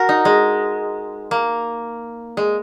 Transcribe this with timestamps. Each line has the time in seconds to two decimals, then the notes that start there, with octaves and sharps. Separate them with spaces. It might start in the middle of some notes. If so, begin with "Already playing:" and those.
Already playing: F#4 A#4
0.09 D#4
0.25 G#3
1.31 A#3
2.37 G#3